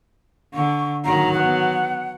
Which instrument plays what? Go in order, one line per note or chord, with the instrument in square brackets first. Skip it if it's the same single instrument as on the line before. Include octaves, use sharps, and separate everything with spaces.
[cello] D3 [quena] C#6
[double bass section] G#2 D#3 A#3 [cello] F#3 [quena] A#5
[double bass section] B3 [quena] F#5